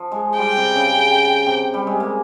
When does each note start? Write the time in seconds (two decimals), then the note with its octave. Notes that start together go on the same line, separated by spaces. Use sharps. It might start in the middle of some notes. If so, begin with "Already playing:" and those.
Already playing: F3
0.12 G#3
0.39 G3 G5
0.57 C3
0.75 C#3
1.46 C3
1.74 G3
1.87 G#3
2.00 A#3